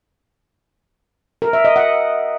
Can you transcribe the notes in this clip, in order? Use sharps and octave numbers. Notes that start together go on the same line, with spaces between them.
A#4
E5
D#5
F#5